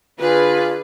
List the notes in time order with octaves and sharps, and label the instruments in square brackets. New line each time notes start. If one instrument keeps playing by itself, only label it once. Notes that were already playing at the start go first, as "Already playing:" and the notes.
[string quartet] D3 G#4 [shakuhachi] F4 [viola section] B4